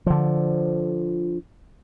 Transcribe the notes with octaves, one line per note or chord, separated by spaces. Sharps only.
D3 F3